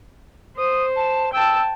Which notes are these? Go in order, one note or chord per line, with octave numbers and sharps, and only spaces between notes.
C5 D#6
A5
G5 A5 E6